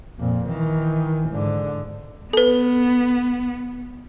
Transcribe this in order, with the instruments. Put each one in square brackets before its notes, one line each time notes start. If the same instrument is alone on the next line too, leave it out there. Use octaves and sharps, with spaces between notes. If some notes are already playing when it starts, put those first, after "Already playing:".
[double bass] F2 A#2
D#3 E3
G#2 D3
[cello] B3 [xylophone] A4 B4